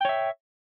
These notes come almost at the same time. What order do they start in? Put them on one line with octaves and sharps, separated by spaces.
G5 C#5 E5